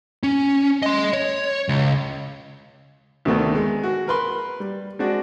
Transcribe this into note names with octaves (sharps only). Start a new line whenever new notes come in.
C#4
D#5 C6
C#5
C#2
D2 C3 D#3 A3 B3
G#3
F#4
A#4 B4 C6
G3
G#3 C4 D4 F#4